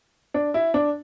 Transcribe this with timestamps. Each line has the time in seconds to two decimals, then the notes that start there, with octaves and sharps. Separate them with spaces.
0.34 D4
0.54 E4
0.74 D4